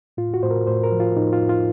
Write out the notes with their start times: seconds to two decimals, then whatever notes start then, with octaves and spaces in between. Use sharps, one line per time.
0.17 A2 F4
0.34 F#4
0.42 A2 C5
0.51 A#4
0.67 A2 C5
0.83 A#4
0.92 F3
1.00 F4
1.16 A2 D#4
1.33 F4
1.41 A2
1.49 F4